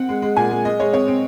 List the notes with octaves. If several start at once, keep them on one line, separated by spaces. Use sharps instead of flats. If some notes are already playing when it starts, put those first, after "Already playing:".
Already playing: C4 F#5
G#3
G#3
A#2 G#5
G#3
G#3 D#5
G#3 C#5
C4 C#5
C4